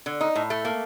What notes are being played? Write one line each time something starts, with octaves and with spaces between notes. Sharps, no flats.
D3
D#4
A2
A3
A#3